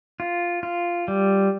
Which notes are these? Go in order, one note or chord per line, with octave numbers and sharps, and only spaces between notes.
F4
F4
G3